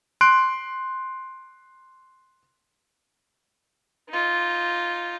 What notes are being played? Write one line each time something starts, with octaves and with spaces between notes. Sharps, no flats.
C6 F#6 D7
D#4 F4